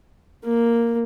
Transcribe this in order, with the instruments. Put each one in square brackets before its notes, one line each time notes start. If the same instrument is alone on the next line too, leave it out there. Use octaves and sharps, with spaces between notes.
[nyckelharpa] A#3